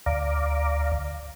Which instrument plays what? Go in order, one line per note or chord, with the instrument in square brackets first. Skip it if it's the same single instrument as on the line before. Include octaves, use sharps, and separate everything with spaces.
[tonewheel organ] D2 D5 F5 A#5 D6